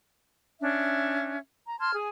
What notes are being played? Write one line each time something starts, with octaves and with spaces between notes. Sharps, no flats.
C#4 D4 E5
A#5
A5 C6 F6 G#6
G#4 G#5